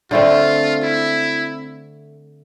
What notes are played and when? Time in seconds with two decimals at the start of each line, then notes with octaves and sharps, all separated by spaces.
0.11 D3 A3 C4 F4
0.83 E4